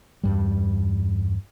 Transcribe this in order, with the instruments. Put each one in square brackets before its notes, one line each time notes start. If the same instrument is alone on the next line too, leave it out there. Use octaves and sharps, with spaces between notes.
[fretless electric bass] E2 G2 G3